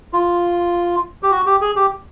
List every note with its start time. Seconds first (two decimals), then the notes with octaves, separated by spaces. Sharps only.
0.13 F4
1.23 G4
1.31 F#4
1.46 G4
1.61 G#4
1.76 G4